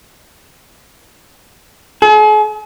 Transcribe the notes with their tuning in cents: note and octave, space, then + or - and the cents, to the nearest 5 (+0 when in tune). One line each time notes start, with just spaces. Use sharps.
G#4 +45